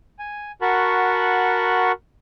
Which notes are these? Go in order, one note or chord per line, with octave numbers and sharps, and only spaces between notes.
G#5
F#4 A#4 F#5 A5 B5 C#6